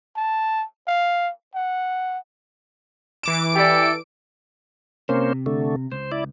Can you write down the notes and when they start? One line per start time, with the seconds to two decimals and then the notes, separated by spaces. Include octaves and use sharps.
0.17 A5
0.88 F5
1.55 F#5
3.23 E3 D6 D7 E7
3.55 G4 A4 D5
5.09 C3 A#3 C#4 C5
5.46 D3 A3
5.92 C#2 C5
6.12 E4 D5